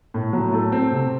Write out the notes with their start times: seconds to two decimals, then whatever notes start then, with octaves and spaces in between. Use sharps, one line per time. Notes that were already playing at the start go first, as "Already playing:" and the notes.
0.14 A2
0.33 F#3
0.53 A3
0.72 C4
0.92 C3